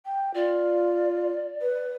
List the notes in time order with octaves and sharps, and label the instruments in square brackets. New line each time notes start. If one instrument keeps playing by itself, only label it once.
[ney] G5
[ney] F4 [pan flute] D5
[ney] B4